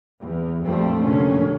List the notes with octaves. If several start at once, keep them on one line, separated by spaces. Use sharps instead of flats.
E2
A#1 F2 F3 G3 A3 C4
F1 A#2 D3 F#3 C#4